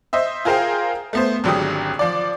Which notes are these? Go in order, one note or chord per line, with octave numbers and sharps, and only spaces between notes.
C5 D#5 E5
F4 G#4 A#4 C5 F5 G5
A3 B3 C5
G#1 D3 F#3 G#3 G4 D#6
F3 D5